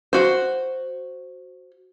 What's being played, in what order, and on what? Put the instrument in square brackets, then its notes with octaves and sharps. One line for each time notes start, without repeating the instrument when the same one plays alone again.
[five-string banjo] F#4 C5